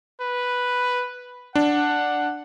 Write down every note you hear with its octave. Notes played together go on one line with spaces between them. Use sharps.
B4
D4 F#5